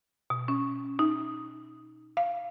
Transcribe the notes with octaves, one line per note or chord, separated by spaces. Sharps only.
B2
C#4
D#4
F5